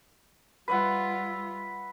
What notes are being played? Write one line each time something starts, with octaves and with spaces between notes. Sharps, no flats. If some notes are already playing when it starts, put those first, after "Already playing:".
G3 F4 B4 E5 F#5